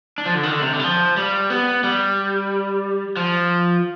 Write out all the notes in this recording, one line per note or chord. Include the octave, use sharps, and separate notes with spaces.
D4
F3
D3
D#3
D3
C3
D3
G3
F3
G3
B3
G3
F3